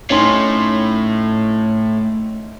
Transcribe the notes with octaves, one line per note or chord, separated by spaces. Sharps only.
A2 C#4 D#4 C6